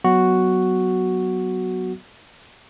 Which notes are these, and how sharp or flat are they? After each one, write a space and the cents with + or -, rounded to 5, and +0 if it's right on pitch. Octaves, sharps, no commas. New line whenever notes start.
F#3 +5 B3 +0 F#4 +0